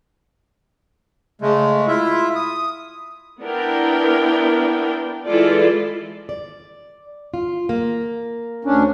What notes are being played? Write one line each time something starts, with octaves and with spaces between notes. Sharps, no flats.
C#3 G#3 A3
E4 F4 E5
D#6
B3 D4 E4 A#4 G5
E3 G#3 E4 F4 A4 D5
D5
F4
A#3
D2 C#4 D4